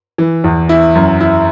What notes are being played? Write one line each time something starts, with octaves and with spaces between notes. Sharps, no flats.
E3
E2
E4
F#2
E4